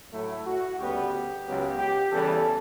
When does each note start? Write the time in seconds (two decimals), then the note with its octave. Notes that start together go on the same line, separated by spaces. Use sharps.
0.12 A2 F#3 A3 E4
0.45 F#4
0.78 D2 C#3 G3 B3 G4
1.45 C#2 C#3 F#3 B3
1.78 G4
2.10 E2 C#3 E3 G3 A4